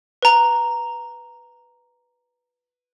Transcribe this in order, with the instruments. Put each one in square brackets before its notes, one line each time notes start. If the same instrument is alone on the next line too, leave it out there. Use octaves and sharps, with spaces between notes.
[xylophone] B4 A#5